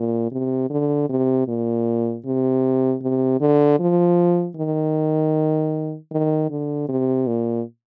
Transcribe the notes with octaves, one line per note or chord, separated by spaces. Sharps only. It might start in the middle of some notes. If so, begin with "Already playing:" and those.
Already playing: A#2
C3
D3
C3
A#2
C3
C3
D3
F3
D#3
D#3
D3
C3
A#2